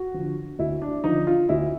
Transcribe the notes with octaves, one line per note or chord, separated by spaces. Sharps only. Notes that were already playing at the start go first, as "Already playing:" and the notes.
Already playing: F#4
D3 F3
D2 E4
D4
D3 F3 D#4
F4
D2 E4